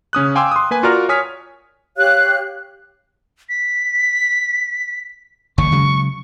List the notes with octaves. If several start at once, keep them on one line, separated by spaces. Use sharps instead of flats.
C#3 C#4 D#6 F#6
F5 G5 G#5 C6 D6 E6
C6 D#6
A#3 B4 G#5
F4 F#4 A#4 D5 A#5 F6
C#5 G#5 D#6 F6 B6
G4 C#5 F5 F#6
B6
F#1 D#2 D#3 C#6
C#3 F#3 G#3